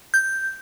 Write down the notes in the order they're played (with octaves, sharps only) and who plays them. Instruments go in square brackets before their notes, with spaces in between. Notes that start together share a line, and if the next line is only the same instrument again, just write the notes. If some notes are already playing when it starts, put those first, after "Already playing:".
[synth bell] G6